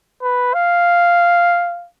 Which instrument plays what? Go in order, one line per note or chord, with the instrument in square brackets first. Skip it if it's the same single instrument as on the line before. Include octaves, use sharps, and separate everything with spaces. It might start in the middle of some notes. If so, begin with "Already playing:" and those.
[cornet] B4
F5